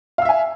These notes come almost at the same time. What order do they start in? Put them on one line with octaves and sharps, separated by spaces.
F5 E6 E5 G#5